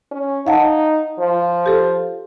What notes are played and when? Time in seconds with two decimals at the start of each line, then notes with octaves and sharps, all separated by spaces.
0.11 C#4
0.47 D#4 F5 F#5 A5
1.19 F3
1.66 G4 A4